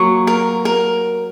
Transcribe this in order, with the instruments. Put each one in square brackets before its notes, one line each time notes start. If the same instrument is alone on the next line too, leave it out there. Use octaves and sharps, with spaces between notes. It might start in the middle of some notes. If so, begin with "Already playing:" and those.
Already playing: [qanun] F#3 A#3 [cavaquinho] C#6
[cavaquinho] A#4
A#4